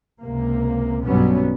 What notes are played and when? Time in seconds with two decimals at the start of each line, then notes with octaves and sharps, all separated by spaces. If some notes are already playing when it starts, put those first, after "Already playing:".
0.20 C#2 C3 A#3
1.04 B1 G2 F#3 G3 B3 C#4